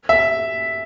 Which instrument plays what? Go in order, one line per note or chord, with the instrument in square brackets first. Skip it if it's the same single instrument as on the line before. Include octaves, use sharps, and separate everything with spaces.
[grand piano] E5